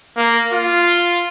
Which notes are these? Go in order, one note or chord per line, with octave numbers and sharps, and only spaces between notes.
A#3
F4